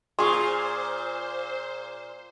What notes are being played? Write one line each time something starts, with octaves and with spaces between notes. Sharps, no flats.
A#2 F4 G#4 C5 G#5 C6 C#6